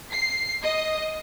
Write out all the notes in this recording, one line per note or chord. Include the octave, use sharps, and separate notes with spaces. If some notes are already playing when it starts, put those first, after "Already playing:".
C7
D#5